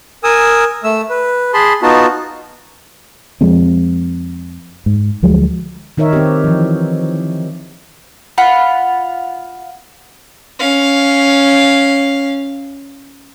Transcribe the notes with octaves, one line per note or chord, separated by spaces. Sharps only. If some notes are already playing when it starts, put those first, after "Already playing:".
A#4 G#5 D#6 E6
A3 E6
B4
G#4 A5 B5 C6
B3 D#4 F4 F#4 A5
F2 F3 G#3 C4
G#2
D2 F3 F#3 G#3
D#3 D#4 A#4 C#5 E5
C4 G4
E3 F3
F4 F#5 B5
C#4 F5